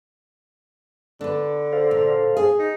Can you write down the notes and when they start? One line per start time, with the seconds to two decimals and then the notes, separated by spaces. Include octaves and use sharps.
1.21 D3 D4 B4
1.73 A4 C5 F5
1.91 A#2
2.37 G#4
2.59 D#4